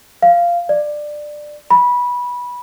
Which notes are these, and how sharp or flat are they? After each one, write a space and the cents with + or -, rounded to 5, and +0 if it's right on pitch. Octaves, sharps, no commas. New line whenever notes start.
F5 -10
D5 +15
B5 -15